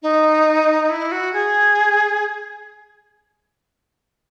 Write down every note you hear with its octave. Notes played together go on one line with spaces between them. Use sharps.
D#4
E4
F#4
G#4